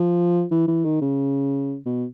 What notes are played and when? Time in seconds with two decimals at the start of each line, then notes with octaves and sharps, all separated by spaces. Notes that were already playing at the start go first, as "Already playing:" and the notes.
Already playing: F3
0.51 E3
0.68 E3
0.85 D#3
1.01 C#3
1.85 B2